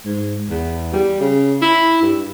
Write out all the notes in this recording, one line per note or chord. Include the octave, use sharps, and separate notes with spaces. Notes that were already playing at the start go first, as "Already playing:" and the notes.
G#2
E2
G3
C#3
E4
G2